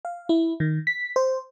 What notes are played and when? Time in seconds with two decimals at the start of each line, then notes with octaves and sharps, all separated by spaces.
0.05 F5
0.29 E4
0.60 D#3
0.87 B6
1.16 C5